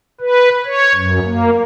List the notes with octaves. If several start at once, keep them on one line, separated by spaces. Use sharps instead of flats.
B4
C#5
F#2
A#3